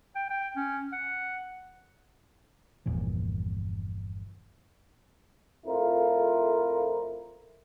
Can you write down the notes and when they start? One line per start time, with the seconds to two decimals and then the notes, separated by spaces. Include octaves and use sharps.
0.16 G5
0.30 G5
0.56 C#4
0.93 F#5
2.86 G1 E2 A#2 F3
5.67 F2 A3 E4 F4 A#4